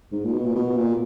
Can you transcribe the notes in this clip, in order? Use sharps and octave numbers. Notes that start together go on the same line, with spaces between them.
G#2
A#2
B2
A#2
B2
A#2